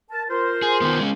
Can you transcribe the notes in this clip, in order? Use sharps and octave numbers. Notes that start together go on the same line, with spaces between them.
A#4 A5
F4 A#4 C5
G#4
D#3 B3
G#3 C#4